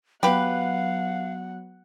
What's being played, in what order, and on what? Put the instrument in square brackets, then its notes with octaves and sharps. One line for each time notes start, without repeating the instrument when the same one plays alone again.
[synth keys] F#3 B3 [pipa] G4 B4 [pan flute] F5 [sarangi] F#5